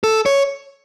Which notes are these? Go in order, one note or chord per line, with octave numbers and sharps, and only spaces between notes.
A4
C#5